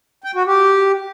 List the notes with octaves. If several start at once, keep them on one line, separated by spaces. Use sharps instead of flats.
G5
F#4
G4